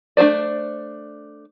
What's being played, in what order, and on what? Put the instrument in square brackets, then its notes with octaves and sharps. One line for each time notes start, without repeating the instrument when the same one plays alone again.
[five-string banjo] A3 D4 G#4 C5 D5